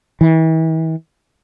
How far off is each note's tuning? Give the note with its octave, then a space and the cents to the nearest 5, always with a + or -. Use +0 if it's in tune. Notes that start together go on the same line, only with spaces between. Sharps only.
E3 -40